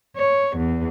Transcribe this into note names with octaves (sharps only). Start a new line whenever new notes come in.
C#5
E2